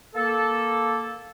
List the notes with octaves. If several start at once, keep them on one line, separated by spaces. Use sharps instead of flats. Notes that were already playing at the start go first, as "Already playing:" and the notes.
A#3 A4